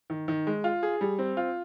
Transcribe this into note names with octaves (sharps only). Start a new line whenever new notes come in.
D#3
D#3
G#3
F4
G#4
G3
C4
F4